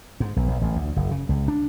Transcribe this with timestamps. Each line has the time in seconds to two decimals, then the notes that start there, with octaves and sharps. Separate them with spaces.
0.20 G#2
0.36 B1
0.48 B1
0.61 A1
0.75 D2
0.96 F#1
1.11 C#3
1.29 C#2
1.48 D4